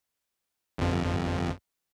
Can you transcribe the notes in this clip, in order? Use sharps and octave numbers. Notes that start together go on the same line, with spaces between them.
G1 F2